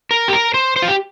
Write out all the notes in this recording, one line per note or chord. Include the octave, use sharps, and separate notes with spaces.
A#4
G4
A#4
C5
C5
F4
G4